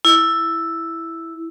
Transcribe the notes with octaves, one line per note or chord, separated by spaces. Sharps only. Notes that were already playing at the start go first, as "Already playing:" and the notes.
E4